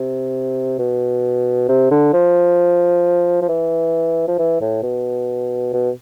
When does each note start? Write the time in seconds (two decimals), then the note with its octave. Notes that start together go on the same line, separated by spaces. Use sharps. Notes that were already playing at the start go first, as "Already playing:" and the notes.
Already playing: C3
0.79 B2
1.68 C3
1.91 D3
2.13 F3
3.42 F3
3.48 E3
4.28 F3
4.38 E3
4.61 A2
4.83 B2
5.73 B2